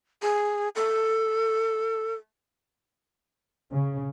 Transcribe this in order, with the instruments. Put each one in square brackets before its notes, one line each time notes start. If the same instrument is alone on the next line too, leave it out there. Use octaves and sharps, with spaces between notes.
[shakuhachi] G#4
A4
[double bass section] C#3